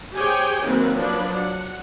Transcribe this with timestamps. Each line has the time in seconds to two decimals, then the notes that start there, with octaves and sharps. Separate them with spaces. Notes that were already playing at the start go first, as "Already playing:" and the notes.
0.14 G4 G#4 C5 C#5 G5 G#5
0.63 D#3 F#3 A#3 C4 B4
0.97 F3 F#3 D4 B4
1.32 F#5